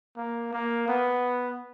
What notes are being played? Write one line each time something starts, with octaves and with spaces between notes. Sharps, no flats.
A#3
A#3
B3